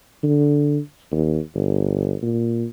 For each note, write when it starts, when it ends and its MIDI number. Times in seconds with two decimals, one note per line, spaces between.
0.24 0.79 50
1.12 1.39 39
1.55 2.15 31
2.22 2.67 46